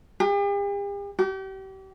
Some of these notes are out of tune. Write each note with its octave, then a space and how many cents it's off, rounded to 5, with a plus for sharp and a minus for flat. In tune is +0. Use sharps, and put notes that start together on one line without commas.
G4 +45
G4 -35